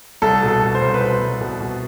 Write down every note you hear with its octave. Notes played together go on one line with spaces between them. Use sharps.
C2 A4
B2
A4
B2
C5
C2
B4
B2 C5
C2
B2
B2